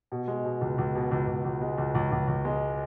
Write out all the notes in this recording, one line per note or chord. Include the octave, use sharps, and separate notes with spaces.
B2
G#3
B2
C#2
C#2
B2
C#2
C#2
C#2
G#3
C#2
C#2
C#2
C#2
G#3